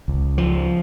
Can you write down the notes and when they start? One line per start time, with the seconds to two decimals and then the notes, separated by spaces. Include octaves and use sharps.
0.08 C#2
0.38 F3